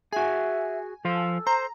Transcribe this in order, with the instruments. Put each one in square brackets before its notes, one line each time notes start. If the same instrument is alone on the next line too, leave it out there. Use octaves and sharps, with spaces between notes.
[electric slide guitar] F#4 G#4 [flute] E5 [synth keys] G#5
[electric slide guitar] F3 C5 F5 [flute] A4
[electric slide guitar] C5 [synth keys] A#5